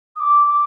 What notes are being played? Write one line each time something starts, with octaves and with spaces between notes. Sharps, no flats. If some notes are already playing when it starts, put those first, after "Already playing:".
D#6
D6
D6